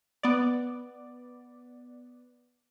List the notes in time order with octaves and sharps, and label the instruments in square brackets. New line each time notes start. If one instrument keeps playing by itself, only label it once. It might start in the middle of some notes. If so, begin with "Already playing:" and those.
[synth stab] B3 D5